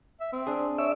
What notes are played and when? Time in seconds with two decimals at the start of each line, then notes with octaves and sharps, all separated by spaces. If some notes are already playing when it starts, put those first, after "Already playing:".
0.20 E5
0.32 C4
0.47 D4 G#4
0.78 C#5 D5 E5 E6